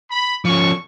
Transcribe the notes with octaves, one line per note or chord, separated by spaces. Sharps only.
B5
F3 C#4 C#6